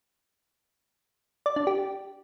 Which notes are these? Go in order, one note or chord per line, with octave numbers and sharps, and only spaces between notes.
D5
D4
G4